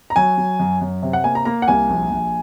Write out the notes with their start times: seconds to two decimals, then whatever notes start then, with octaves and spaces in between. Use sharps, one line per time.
0.10 A#5
0.16 F#3 G#5
0.37 F#3
0.59 F#2
0.81 F#2
1.03 C3
1.13 F#5
1.24 A#3 G#5
1.35 A#5
1.45 A#3 A#5
1.62 F#5
1.68 C2 G#5
1.90 A#1
2.10 A#1